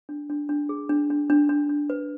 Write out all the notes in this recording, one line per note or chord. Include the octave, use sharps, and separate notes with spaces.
D4
D4
D4
G#4
D4
D4
D4
D4
D4
B4